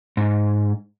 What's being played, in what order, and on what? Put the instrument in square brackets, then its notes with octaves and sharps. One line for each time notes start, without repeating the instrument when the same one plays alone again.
[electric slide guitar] G#2